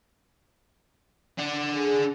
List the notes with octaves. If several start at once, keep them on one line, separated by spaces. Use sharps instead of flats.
D4 F#5
G#4